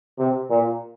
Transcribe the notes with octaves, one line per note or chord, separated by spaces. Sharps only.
C3
A#2